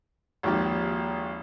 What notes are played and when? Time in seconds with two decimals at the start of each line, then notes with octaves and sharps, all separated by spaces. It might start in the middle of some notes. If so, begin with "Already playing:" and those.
0.43 G#1 D#2 F3 G4